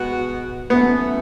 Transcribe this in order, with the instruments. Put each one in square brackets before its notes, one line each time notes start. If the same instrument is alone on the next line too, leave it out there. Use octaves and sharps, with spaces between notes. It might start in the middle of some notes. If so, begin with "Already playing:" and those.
Already playing: [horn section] B2 G#3 B3 F#4
[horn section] F#2 E3 A3 [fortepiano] B3